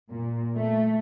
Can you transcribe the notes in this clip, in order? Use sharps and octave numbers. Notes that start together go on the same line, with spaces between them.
A#2
A3